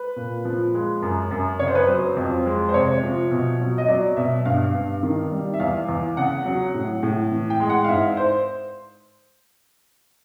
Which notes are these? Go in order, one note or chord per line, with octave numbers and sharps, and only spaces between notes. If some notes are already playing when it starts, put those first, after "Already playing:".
Already playing: B4
A#2
F3
G#3
F#2
F#2
C#3 C#5
C5
B4
C5
F#3
F2
G#3
C5
C3 C#5
F3
B2
F#3
D#5
F#3 D5
B2 E5
G2 F5
G2
D#3
G3
E5
E2 F5
E2
C#3 F#5
F#3
A2
A2
E3
G5
G#3
F#5
F5
G#2 E5
C5